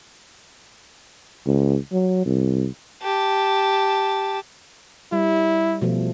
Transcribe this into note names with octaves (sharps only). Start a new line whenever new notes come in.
C#2
F#3
C2
G4 A5
G3 E4
B2 F3 A3